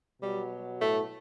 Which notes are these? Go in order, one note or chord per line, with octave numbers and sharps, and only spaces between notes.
B2 F#3 G3
A2 A3